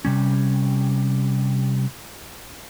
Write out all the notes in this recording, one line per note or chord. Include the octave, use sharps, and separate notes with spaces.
C3 G3 C#4